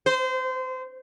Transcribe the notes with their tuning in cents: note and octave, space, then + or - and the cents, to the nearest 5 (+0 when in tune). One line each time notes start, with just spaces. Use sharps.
C5 -25